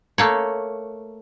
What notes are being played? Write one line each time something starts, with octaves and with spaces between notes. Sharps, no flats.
A3 A#3 C#5